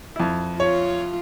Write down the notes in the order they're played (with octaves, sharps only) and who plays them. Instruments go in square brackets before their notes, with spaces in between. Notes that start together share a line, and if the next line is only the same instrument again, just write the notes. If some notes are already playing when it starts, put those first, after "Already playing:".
[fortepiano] F2 E4
[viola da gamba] F4 [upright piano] C#5